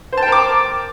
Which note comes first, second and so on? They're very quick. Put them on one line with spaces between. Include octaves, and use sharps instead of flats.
C5 A5 G5 A#4 D6